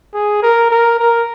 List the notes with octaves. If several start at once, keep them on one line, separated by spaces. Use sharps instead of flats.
G#4
A#4
A#4
A#4